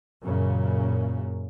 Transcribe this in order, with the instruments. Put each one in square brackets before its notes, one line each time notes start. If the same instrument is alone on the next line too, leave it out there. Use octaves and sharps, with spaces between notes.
[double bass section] F#2 A#2 C#3